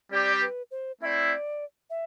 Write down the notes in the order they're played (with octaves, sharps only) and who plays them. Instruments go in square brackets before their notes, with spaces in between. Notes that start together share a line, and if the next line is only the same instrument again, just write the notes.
[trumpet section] G3 C4 G4 [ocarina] D5
[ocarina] B4
C5
[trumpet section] A3 C4 E4 [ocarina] D5 E5
[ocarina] E5